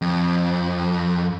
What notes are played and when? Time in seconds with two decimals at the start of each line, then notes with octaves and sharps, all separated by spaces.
0.02 F2